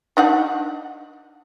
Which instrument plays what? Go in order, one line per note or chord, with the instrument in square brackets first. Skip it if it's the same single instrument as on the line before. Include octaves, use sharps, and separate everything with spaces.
[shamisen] D4 D#4 F#5